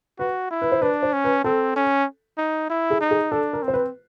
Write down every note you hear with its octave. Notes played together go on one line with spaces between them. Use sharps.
F#4 B4
E4
B4
C5
D4 B4
C5
C#4
B4
C4 A4
C#4
D#4
E4
G#4
D#4
G#4
D4 A4
A#4
C4
C5
B4